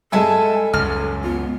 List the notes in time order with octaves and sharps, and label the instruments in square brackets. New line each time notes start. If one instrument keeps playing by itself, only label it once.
[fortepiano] G2 G#3 [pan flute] A4 [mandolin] E5 G#5 A5
[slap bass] C#2 F#2 [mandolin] F6
[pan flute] B3 [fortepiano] F4